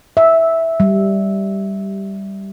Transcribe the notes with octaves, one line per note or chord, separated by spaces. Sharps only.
E5
G3